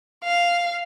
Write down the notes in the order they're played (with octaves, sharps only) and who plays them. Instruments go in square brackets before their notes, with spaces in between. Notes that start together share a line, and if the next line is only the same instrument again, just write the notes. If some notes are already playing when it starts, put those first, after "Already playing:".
[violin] F5